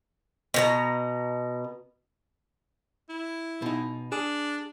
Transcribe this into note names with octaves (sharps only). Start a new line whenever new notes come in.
B2 G4 A#5
E4
B2 D#4
D4 G#4